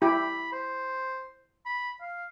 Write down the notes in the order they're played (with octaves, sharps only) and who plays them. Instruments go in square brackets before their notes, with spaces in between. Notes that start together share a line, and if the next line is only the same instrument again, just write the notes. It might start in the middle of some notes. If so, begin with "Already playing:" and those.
[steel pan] E4 G4 [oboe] B5
[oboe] C5
B5
F5